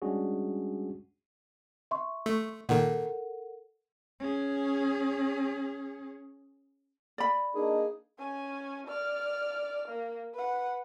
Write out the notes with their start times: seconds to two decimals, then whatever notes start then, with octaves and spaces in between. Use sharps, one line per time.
0.02 G3 G#3 C#4 D4 F#4 G#4
1.91 E5 C6 C#6
2.26 A3
2.69 A#2 D#3 A4 A#4 F#5
4.20 C#4 G#4
7.18 D5 B5
7.55 A#3 D4 D#4 G#4
8.19 C#4 G#5
8.87 D5 F6
9.89 A#3
10.34 B4 F#5